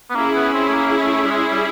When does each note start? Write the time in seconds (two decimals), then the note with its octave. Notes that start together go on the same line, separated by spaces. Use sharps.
0.10 B3
0.16 A#3 C#4 E4 G#4
0.36 B3
0.54 C4
0.68 A3
0.74 A#3
1.02 A3
1.25 G3
1.32 G#3
1.51 G3